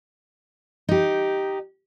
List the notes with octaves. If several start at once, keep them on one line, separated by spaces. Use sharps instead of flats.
D#4 G4